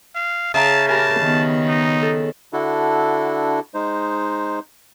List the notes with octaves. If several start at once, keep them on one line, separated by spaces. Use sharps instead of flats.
F5
C#3 E5 A5 A#5
G4 A#4 G#5 A5 B5
D#3 B3
D#4
A4
D3 D4 E4 F#4 A4
G#3 D#4 C5